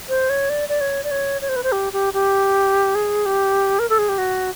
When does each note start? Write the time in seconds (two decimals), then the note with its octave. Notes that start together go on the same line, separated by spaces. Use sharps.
0.09 C5
0.30 C#5
0.49 D5
0.69 D5
0.81 C#5
1.04 D5
1.11 C#5
1.41 C#5
1.49 C5
1.56 B4
1.63 C5
1.72 G4
1.93 G4
2.14 G4
2.95 G#4
3.26 G4
3.79 A#4
3.90 A4
3.98 G#4
4.09 G4
4.18 F#4